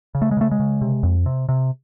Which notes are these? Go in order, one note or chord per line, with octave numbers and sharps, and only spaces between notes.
C#3
A3
G#3
C#3 A3
G#3
C#3
C3
F2
C3
C3